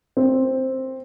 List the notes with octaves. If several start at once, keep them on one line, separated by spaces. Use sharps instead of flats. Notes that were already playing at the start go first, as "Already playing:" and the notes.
C4